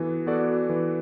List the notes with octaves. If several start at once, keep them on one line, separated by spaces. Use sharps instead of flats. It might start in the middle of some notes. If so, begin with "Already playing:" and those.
Already playing: E3 B3 F#4 A4
B3 F#4 A4 D5
E3